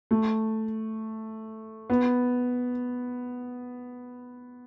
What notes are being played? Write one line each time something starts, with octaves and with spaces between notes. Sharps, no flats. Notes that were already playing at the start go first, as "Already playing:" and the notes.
A3
B3